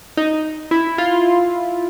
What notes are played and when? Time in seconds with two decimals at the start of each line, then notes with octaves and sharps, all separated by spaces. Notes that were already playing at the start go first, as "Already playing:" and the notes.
0.17 D#4
0.71 E4
0.98 F4